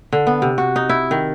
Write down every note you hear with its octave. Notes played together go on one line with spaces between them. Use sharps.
D3
B3
C3
F#4
D#4
E4
D#3